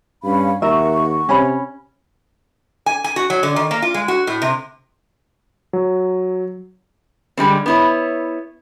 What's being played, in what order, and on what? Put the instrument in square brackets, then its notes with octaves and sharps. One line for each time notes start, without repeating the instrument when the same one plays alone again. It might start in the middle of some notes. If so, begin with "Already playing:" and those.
[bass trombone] G2 [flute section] C#4 F5 B5
[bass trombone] D#2 [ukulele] A#4 E5 [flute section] F#5 C#6
[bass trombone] C3 [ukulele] C#4 C#5 B5
[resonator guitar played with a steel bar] G#5
G#5
F#4
F#3
D3
D#3
A#3
F4
G#3
F#4
A2
C3
[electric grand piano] F#3
[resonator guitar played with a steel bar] D3 G3 G#3 C4
B3 E4 C#5